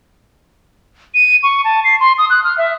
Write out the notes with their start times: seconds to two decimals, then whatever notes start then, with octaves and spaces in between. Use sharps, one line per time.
1.14 D#7
1.43 C#6
1.64 A5
1.84 C7
2.00 C6
2.18 D#6
2.30 F#6
2.44 F6
2.58 E5